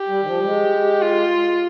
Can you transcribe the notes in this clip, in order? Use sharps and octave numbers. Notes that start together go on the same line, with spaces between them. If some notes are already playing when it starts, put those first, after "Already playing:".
Already playing: G4
G3
D#3
F3
G3
G#3
F4